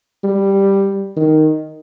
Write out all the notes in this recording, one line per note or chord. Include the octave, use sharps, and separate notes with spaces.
G3
D#3